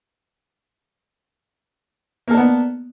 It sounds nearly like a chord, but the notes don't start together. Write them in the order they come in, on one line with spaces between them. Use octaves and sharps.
A#3 A4 D4 B3